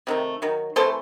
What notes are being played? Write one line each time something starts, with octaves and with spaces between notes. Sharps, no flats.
C3 D#3 A3
D#3 F#3
C3 E3 A3 A4 C5